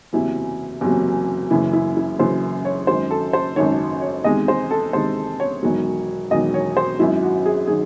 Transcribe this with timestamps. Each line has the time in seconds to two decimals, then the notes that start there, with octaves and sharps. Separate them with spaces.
0.13 F#1 E2 C3 F#3 E4
0.81 F#1 E2 C3 F#3
1.51 F#1 F#2 C#3 E3 E4
1.73 E4
1.96 E4
2.19 F#1 F#2 C#3 E3 C5
2.65 C#5
2.87 G#1 F#2 D#3 C5
3.11 A4
3.33 C5
3.56 G#1 F#2 D#3 C#5
4.01 C#5
4.24 E2 C3 D#3 G#3 D#5
4.48 C5
4.71 A4
4.93 E2 C3 D#3 G#3 C5
5.40 C#5
5.63 E1 E2 D#3 F#3
6.31 E1 E2 D#3 F#3 D#5
6.54 C#5
6.77 C5
6.99 G#1 F#2 D#3 F#3 E4
7.22 F#4
7.46 G#4
7.67 D#3 F#3 G#4